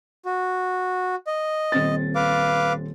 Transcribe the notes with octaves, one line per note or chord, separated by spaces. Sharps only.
F#4
D#5
D#1 C4 A6
B4 F5 D6